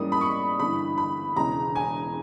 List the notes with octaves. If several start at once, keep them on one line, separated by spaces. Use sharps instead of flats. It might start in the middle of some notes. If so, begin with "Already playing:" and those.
Already playing: G#2 E3 G3 A#3 C#4 D#6
B5
C#6
G1 G2 E3 B5
B5
E1 E2 C#3 G#3 A#5
G#5